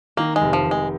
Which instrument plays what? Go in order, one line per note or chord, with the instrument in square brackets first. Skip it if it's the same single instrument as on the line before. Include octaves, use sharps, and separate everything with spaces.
[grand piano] D#3 [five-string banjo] A#3
[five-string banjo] G#3
[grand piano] F1
[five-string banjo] F3
[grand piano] F1
[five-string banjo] G#3